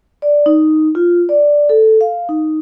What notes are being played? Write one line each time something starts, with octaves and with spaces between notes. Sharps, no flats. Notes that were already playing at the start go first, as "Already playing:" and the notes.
D5
D#4
F4
D5
A4
F5
D#4